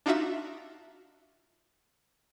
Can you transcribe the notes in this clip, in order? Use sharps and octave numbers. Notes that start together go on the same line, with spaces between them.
D4 D#4 F4 F#4 E5